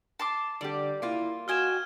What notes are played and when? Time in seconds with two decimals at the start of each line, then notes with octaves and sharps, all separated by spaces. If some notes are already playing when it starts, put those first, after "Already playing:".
0.19 A5 C6 D6
0.61 D3 G3 G4 D5
1.02 A#3 E4 F4
1.48 F#4 D#5 G5 G#5 F6 G#6 E7